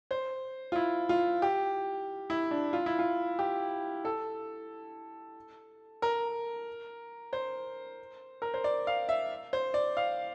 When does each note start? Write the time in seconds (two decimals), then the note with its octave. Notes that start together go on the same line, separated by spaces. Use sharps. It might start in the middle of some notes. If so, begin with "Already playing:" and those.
0.11 C5
0.72 F4
0.76 E4
1.09 F4
1.42 G4
2.30 E4
2.51 D4
2.73 F4
2.86 E4
2.99 F4
3.39 G4
4.05 A4
6.02 A#4
7.33 C5
8.42 A#4
8.54 C5
8.64 D5
8.87 F5
9.09 E5
9.53 C5
9.74 D5
9.97 F5